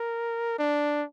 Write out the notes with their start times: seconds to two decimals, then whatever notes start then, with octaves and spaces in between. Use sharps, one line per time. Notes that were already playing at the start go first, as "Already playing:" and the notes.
Already playing: A#4
0.59 D4